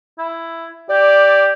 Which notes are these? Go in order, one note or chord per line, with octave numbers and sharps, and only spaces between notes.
E4
G4 D5